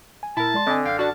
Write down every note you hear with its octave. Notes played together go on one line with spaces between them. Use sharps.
G#5
A#2 E4 A#4 A5
G#3 D5 C6
D3 C4 D#5 G#5
F#2 F5 G5 F6
D4 F#4 A5